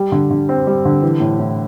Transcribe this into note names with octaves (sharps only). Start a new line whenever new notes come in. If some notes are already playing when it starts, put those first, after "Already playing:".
Already playing: G3
D3
D3
C4
G3
D3
E3
A2
A2